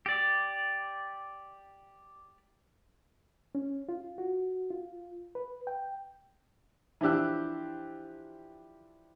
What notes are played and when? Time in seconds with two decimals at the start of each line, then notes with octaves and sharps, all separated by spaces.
0.06 G4 D5
3.55 C#4
3.89 F4
4.18 F#4
4.71 F4
5.35 B4
5.67 G5
7.01 E3 F3 D4 G4 E6 F#6